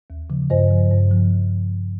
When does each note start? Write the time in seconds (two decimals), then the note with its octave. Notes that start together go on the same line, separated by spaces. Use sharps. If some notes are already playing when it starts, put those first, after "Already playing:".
0.10 D#2
0.30 C#3 F3
0.50 G2 C5 D#5
0.70 F3
0.91 G2
1.11 F3